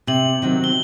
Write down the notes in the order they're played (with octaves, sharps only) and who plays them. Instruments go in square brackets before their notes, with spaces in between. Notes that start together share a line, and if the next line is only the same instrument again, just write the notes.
[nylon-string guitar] C3 [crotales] F#7
[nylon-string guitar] D#3 F#3 C4
[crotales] G7